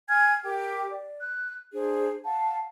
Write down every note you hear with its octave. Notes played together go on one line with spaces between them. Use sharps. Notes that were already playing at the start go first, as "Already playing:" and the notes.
F#5 G#5 F6 G#6
G4 A#4 G5 D6
D5
F#6
D4 G#4 C5
F5 F#5 A5